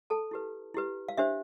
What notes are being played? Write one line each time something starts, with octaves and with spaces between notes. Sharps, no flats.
A4 A5
E4 G4 B4
E4 G4 B4
F5
D4 G4 C5 E5